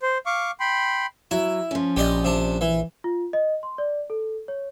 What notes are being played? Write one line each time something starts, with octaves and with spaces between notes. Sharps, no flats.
C5
F5 C#6 D6
G5 B5 C6
F#3 E4
F3 C#4
A#1 G4 D5 D#5
C3 D4
E3
F4
D#5
C6
D5
A4
C#5